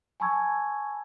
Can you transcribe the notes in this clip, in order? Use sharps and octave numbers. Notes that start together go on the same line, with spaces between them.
G#5 A5 B5 C#6 E6 G#6